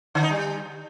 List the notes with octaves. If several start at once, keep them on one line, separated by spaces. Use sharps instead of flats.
D3
D#4
G3